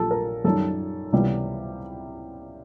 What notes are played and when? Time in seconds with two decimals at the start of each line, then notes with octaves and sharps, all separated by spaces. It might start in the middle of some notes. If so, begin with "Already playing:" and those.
Already playing: A#1 A#2 F#3 A4
0.11 A#4
0.44 F#2 D#3 G3 A4
1.12 C#2 C3 E3 G3 B3